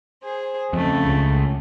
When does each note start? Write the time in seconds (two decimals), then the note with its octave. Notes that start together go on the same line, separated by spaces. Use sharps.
0.23 G#4 C5
0.73 F2 C#3 A3
1.06 C#2